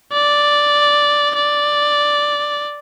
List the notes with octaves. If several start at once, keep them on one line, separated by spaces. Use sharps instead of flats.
D5
D5